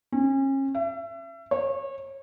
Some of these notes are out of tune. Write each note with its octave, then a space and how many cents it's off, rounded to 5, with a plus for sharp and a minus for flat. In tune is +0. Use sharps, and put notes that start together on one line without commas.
C#4 -35
E5 +35
C#5 -30